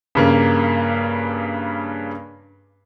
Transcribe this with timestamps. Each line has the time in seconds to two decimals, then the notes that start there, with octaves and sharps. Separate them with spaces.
0.15 G2 C#3 A#3